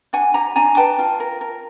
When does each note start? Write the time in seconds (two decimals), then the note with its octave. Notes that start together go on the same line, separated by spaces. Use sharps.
0.13 D4 F#5 G#5
0.34 G4 G#5 A#5
0.56 D4 G#5 A#5
0.77 B4 G5 A5
0.99 F4
1.20 A#4
1.41 A#4